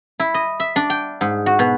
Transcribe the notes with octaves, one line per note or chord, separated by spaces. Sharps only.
E4
D#5
E5
D4
G5
G#2
F#4
B2